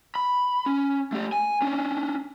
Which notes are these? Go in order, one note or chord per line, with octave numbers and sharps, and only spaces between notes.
B5
C#4
A3 G4
G#5
C#4 D4